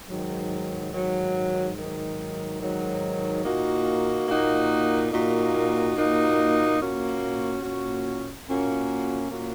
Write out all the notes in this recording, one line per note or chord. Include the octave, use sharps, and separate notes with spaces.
G#2 D#3 F#3
G#2 D#3 F#3
G#2 D#3 F#3
G#2 D#3 F#3
A#2 A#3 D#4 F#4
A#2 A#3 D#4 F#4
A#2 A#3 D#4 F#4
A#2 A#3 D#4 F#4
A#2 A#3 C#4 F#4
A#2 A#3 C#4 F#4
A#2 A#3 C#4 F#4
A#2 A#3 C#4 F#4